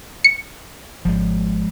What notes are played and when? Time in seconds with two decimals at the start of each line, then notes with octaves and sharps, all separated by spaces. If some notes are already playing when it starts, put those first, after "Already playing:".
0.24 C#7
1.05 G#1 F3 G#3